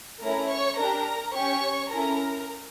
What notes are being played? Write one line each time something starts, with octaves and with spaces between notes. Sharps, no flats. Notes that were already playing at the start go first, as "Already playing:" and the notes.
A3 C#4 E4 A#4 A#5
C#5 C#6
D4 G4 A#4 A#5
C#4 G4 C#5 C#6
C#4 E4 A4 A#4 A#5